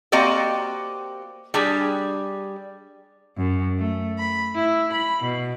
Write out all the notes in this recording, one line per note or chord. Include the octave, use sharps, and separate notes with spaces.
A#3 C4 F#4 G4 D5 D#5
G3 D4 G4 G#4
F#2
A3
B5
E4
B5
B2